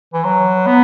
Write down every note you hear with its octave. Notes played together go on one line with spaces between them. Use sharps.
E3
F#3
B3